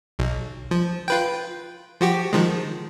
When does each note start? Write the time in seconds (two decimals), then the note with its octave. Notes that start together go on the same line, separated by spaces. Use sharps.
0.19 B1
0.71 F3
1.08 F4 B4 G5
2.01 F3 F#4 G4
2.33 D#3 F3 G#3